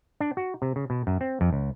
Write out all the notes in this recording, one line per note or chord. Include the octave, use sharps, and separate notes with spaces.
D4
F#4
C3
C#3
B2
F#2
C4
F2
C#2